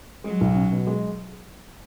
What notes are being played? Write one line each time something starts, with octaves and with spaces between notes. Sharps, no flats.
F#3 G#3
B1
C#4
B2
G#3